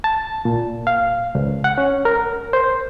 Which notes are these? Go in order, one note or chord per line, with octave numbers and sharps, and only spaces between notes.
A5
A#2
F5
C#2
F#5
C#4
A#4
C5